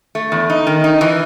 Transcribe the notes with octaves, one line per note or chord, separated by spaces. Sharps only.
A3
E2
D#4
D#3
D#4
E3